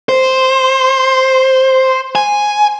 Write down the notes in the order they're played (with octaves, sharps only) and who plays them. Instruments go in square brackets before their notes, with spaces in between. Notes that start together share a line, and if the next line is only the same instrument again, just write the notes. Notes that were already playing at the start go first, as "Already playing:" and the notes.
[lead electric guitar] C5
G#5